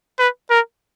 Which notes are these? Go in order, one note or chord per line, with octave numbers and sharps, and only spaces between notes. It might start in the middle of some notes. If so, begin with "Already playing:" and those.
B4
A#4